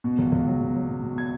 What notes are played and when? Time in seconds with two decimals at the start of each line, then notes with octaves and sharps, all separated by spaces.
0.04 B2
0.19 C#2
0.32 C#2
0.47 F#3
0.61 B2
0.75 F#3
0.88 B2
1.03 B2
1.18 G#6